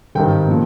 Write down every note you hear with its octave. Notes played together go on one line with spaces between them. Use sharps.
G#1 G2 D#3 G5
A#2 F3